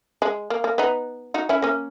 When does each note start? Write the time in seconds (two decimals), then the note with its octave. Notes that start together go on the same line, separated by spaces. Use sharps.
0.22 G#3
0.50 A#3
0.64 A#3
0.78 B3 D#4
1.34 D#4 F#4
1.49 C#4 E4
1.62 A#3 C#4